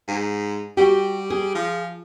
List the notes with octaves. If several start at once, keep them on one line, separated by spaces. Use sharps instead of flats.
G#2
G3 F#4 G4
G#4
F3